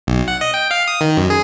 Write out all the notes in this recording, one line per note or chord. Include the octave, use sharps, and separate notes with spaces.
B1
F#5
D#5
G5
F5
D#6
D#3
F#2
G#4